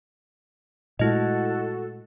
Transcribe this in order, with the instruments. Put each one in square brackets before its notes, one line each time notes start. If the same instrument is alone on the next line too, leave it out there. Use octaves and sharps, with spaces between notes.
[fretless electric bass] A#2 G#3 A3 [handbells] E4 D#5 [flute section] F#4 A4